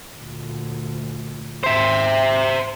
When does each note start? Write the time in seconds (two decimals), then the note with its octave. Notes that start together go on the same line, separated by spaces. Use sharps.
0.16 D2 A#2
1.64 G#1 D#2 C5 E5